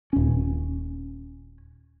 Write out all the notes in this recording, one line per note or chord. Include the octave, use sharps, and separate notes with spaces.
D#1 C#4